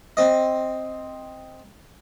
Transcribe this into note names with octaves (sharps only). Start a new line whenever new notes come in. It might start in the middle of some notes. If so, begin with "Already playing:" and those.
C4 D#5